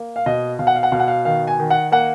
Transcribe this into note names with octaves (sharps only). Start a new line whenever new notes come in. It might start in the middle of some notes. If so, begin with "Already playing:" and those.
Already playing: A#3
F5
B2 D#5
B2 F5
F#5
F5
F#5
B2 F5
F#5
F5
D#3 F5
G#5
D#3
F#5
A#3 F#5